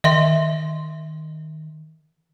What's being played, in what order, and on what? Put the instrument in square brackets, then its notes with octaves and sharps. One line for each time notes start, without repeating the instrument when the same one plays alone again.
[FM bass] D#3 [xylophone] D#5 E5 C6